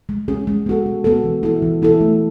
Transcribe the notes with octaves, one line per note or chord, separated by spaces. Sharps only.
G#3
C#4 G#4
G#3
B3 F#4 A4
G#3
B3 F#4 A4
E3
B3 E4 A4
E3
B3 E4 A4
A3